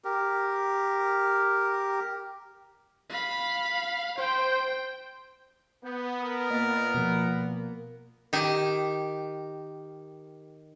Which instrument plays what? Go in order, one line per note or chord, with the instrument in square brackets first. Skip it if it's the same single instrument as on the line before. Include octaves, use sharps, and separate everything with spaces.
[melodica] G4 A#4
[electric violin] F5 B5
[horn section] C5 [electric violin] G5
[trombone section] B3 [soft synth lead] G6
[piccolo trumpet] A#4 [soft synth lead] F#5 [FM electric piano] D#6
[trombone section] A#2 B3 [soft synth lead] A#3 [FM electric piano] D#5 A6
[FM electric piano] B2 F3
[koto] D#3 G4